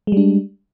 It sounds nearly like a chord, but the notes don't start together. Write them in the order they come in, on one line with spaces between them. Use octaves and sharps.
G#3 G3 D4